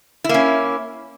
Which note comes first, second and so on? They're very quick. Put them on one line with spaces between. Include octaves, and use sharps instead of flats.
E4 A#3 C#4